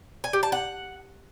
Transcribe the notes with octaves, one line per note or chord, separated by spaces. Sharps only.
G#5
G4
A5
F#5